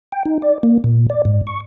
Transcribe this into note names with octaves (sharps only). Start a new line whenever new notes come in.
G5
D#4
D5
A#3
A#2
D5
G#2
C#6